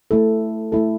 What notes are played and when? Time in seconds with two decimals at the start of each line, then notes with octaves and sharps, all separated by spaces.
0.11 A3 E4 A4
0.72 A3 E4 A4